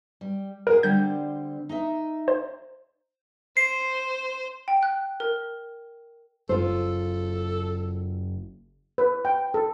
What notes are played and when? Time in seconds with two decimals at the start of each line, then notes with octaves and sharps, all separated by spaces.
0.21 G3
0.67 F#4 G#4 A#4
0.83 D3 G3 C4 G6
1.69 D#4 D#5 E5
2.28 C5
3.57 C5 C7
4.68 G5
4.83 F#6
5.20 A#4
6.49 F#1 F4 A4 C5
8.98 B4
9.25 G5
9.54 A4